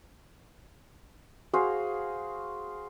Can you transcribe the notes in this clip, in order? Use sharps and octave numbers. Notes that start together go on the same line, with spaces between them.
F#4 G#4 C5 F5